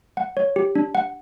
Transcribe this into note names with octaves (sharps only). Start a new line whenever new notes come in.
F#5
C#5
G4
D4
F#5